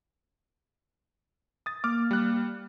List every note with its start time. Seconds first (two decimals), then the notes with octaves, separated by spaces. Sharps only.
1.66 D#6 A6
1.84 A#3 D6 F6
2.11 G3 F#6